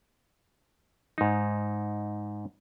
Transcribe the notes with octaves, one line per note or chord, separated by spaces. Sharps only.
G#2 D#4